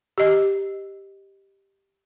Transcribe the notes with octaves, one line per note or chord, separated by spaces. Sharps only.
G4 D#5